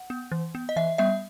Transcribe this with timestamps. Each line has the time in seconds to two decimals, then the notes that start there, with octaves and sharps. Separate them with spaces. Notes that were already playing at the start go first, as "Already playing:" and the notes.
Already playing: F#5
0.10 B3
0.32 E3
0.55 B3
0.69 D#5
0.76 E3 E5
0.98 G3 B3 E5